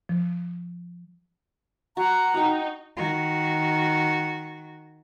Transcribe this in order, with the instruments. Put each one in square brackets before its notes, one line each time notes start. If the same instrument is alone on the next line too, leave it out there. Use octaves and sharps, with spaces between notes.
[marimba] F3
[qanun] F#4 [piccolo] F#5 [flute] A#5
[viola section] D#4 [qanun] F#4 G5
[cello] D#3 F#4